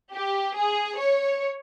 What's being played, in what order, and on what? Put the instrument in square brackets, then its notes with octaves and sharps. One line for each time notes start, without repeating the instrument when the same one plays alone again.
[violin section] G4
G#4
C#5